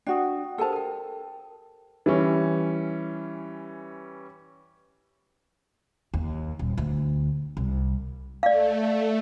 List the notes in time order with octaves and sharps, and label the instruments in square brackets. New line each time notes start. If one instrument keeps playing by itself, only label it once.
[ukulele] D4 F#4 [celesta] G5 D#6
[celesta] G4 A#4 C5 [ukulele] A4 A5
[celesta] A#4 G5
[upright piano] E3 G3 C#4
[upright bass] D#2
D#1
D2
C2
[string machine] A3 [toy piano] D5 F5